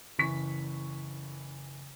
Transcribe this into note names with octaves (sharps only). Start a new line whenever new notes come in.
F#1 E3 C#6 B6